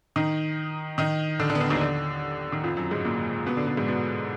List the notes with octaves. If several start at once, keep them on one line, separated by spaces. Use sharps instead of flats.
D#3 D#4
D#3 D#4
D3 D4
D3 D4
B3
D3 D4
D#2 D#3
D3
D#3
F2 F3
F#2 F#3
G#2 G#3
A#2 A#3
B2 B3
D3 D4
B2 B3
G#2 G#3
B2 B3